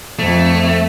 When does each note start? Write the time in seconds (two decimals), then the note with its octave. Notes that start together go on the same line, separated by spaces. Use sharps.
0.19 F2 A3